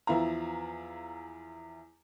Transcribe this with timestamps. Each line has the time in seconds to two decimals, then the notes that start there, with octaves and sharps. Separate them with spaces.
0.07 E2 F3 E4 F5 A#5